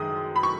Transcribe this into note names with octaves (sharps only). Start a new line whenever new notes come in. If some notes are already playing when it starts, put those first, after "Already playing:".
Already playing: F#2 D#3 G#3 D#6
B5
C#6